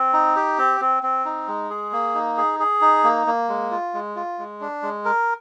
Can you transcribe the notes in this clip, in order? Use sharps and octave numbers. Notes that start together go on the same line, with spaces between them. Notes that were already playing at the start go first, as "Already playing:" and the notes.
Already playing: C4
D#4
G4
C4
C4
C4
D#4
G#3
G#4
A#3
D#4
G#4
G#4
D#4
A#3
A#3
G#3
F4
G#3
F4
G#3
D4
G#3
A#4